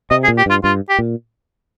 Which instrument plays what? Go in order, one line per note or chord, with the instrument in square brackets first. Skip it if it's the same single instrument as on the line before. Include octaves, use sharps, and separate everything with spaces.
[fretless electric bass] C3 [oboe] D#5
[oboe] G#4
[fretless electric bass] A#2
[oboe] G4
[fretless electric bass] G2 [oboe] F4
[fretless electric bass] G2 [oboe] F4
[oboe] G4
[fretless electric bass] A#2